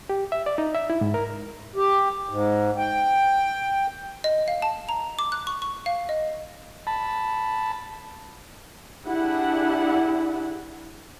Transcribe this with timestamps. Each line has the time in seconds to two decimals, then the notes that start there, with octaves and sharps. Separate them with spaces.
0.10 G4
0.32 E5
0.46 D5
0.58 D#4
0.75 E5
0.90 E4
1.01 G#2
1.14 A#4
1.76 G4
2.29 G#2
2.78 G5
4.24 D#5
4.48 F5
4.62 A5
4.89 A#5
5.19 D6
5.32 F#6
5.47 C#6
5.62 C#6
5.86 F5
6.09 D#5
6.87 A5 B5
9.07 D4 E4 G4 G#4 F#5